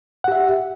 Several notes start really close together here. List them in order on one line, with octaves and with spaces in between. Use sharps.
F#5 G4 E5